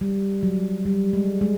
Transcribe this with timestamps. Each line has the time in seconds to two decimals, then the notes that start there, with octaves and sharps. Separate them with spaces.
0.01 G3
0.43 F#3
0.86 G3
1.13 G#3
1.41 G#3